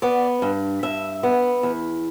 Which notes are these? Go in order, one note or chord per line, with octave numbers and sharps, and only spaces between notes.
B3 D5
G2
G2 E5
B3
E2